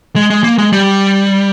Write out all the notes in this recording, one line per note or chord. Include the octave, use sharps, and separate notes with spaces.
G#3
G#3
A#3
G#3
G3